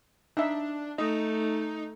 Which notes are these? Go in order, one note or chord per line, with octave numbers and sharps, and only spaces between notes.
D4 D#4 E5
A3 D#4 D#5